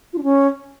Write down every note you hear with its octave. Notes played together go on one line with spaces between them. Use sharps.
F4
D4
C#4